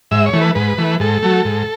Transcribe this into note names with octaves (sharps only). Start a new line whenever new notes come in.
G#2 E5
C#5
E3 A3
B4
G#2 B4
E3 A3
G#2 A4
F#3 A3
G#2